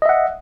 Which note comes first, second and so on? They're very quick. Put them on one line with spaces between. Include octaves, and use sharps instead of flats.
D#5 E5 F#5